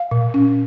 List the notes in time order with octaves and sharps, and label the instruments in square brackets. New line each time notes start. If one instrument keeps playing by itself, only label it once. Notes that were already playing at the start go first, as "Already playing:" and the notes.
Already playing: [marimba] F5
A#2
C#4